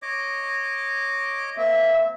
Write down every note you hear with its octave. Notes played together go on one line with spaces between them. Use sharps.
C#5 D#5 D6
A#3 C4 E5